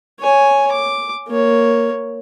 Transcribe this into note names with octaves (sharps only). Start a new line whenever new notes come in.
C#5 G#5
D6
A#3 C#5